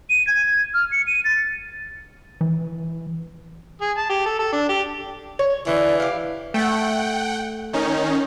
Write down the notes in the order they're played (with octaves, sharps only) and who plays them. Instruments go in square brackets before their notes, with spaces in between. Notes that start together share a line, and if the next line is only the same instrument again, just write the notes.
[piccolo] D#7
G#6
F6
C#7
D#7
A6
[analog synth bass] E3
[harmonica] G#4
A5
G4
A4
A4
D4
G4
[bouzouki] C#5
[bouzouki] D3 [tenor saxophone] E3
[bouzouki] G4 F5
[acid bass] A3 [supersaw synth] F#5 G5
[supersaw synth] D#3 C#4 D#4